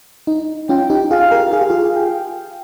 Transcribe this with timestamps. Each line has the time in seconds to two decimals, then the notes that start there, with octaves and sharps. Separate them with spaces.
0.27 D#4
0.69 C#4 F4 G5
0.90 D#4 G4
1.11 F4 G#4 F5
1.31 G4 A#4
1.52 G#4 F5
1.61 G4
1.70 F4 G#4
1.95 G5